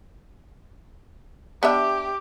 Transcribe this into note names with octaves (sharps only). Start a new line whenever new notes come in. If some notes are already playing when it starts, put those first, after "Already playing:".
B3 D4 G4 E5